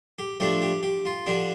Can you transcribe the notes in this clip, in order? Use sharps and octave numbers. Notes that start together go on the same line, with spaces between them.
G4
F3 A3 D4 G4
G4
G4
F4
D3 F3 D4 G4